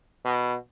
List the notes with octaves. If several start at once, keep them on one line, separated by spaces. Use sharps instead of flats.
B2